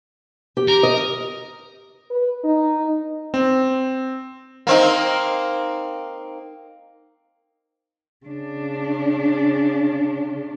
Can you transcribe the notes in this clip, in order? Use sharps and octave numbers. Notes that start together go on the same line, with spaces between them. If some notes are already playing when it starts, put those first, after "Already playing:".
G4
A#4
D#5
B4
D#4
C4
A#3 C4 D#4
C#3 D4